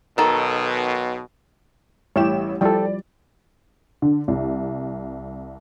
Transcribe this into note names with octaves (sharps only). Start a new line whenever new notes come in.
B1 B2 D#3 A4
A1 G3 E4 G4 C#5 E7
F3 G3 E4 A4 D5 G5
D3
C2